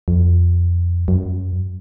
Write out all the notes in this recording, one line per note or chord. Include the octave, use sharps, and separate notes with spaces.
F2
F#2